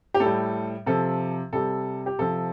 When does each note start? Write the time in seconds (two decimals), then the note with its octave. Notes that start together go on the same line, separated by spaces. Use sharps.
0.14 G4
0.20 A2 A4
0.25 G3
0.86 C3 F3 A4
1.52 C3 G3 A4
2.06 G4
2.19 C3 F3 A4